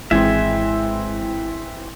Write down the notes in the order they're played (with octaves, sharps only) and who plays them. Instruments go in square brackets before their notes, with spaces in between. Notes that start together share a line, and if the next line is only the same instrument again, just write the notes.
[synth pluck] G#1 G#3 [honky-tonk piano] E3 C4 [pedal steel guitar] E5 G#5